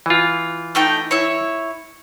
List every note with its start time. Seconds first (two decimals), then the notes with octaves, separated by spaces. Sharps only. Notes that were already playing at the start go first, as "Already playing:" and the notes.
0.06 E3 F4
0.75 A3 D#4 G5
1.11 E4 C#5